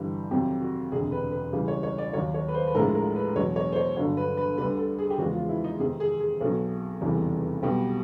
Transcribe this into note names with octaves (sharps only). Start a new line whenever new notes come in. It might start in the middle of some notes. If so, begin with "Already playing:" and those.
Already playing: G1 G2 E3 G3
F2 C3 D#3 F#3 G4
F#4
E1 D2 C3 G#4
B4
B4
C#2 C#3 E3 G3
C#5
C#5
D5
D#2 D#3 F#3 C#5
C#5
B4
C5
B4
A#1 A2 F3 G#3 A#4
A#4
B4
E2 B2 F#3 C#5
C#5
C5
C#5
G1 G2 D3 F#3 C#5
B4
B4
D2 D3 G3 B4
A4
G#4
G4
E2 C#3 F3 G#3 F#4
F4
E4
D#4
F2 C3 D#3 G#4
G#4
G#4
B1 B2 F#3 A4
F1 E2 C#3 E3 G3
B1 B2 G3 G4